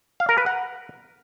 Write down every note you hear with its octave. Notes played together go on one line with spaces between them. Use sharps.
F5
A#4
B4
F#5